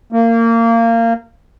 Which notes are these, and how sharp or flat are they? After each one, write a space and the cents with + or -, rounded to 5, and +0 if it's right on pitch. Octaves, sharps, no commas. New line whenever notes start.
A#3 -25